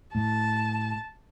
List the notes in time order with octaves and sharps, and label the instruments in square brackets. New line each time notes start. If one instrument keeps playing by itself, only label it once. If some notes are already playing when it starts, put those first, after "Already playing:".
[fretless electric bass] A2 [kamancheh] A5